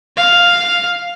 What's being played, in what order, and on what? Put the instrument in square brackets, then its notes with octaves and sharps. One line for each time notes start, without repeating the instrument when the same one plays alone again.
[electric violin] F5